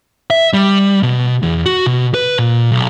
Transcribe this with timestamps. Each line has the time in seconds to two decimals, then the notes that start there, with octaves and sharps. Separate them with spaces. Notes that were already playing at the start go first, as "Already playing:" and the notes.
0.30 E5
0.54 G3
1.03 B2
1.43 E2
1.66 F#4
1.86 B2
2.15 B4
2.39 A#2
2.72 B1